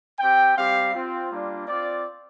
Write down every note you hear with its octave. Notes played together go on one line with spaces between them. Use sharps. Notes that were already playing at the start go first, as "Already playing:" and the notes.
C4 G4 G5
G3 C4 G4 F5
C4 F4
G3 A#3 D4 F4
C4 F4 D5